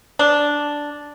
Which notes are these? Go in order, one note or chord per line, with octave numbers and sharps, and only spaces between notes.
D4